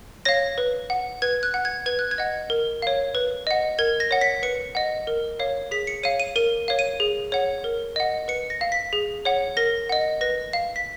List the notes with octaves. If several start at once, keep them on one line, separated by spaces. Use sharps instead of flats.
C#5 F5 A#6
B4
F#5
B4 G#6
F#6
F#5
G#6
B4 G#6
F#6
G#6
D#5 F#5
A#4
C#5 F5
B4
D#5 F#5
A#4 G#6
A#6
C#5 F#5
B6
B4 C#7
D#5 F#5
A#4
C#5 F5
G#4 B6
C#7
C#5 F5 D#7
D#7
A#4 D#7
C#5 F5
D#7
G#4
C#5 F#5
A#4
D#5 F#5
B4 C#7
A#6
F5
B6
G#4
C#5 F#5
A#4 A#6
D#5 F#5
B4 A#6
F5
B6